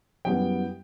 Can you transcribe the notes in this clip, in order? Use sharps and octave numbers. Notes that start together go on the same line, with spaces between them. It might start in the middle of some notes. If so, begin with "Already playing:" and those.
F#2 E3 G3 B3 G5